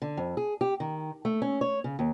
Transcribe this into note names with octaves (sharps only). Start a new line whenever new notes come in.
D3
F2
G#4
G4
D#3
A3
C#4
C#5
C#3
D#2